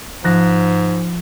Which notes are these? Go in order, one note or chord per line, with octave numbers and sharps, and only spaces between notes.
G#2 F3 F#6 A#6